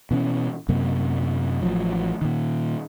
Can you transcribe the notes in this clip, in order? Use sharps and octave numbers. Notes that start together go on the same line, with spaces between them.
B2 E3 C#4
F#2 C3 A#3
A1 C#3 F3 F#3
A#2 D#3